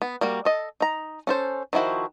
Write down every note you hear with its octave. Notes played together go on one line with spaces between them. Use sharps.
B3
G3 A#3 F#4
A4 D#5
D#4 A#5
C#4 A4 C5
D#3 F3 E4 F#4 C5